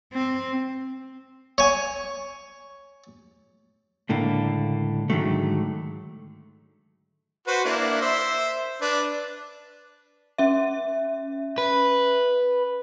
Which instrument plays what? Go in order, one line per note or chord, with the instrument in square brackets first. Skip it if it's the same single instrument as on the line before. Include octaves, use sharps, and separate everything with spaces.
[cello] C4
[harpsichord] C#5 G#5
[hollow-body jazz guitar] C#2 A2 D3 A#3
G#2 D3 D#3 F#3 A3
[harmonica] F#4 B4 C5
A#3 D4 E4
C5 E5
D4 B4
[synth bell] C#4 E5
[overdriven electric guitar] B4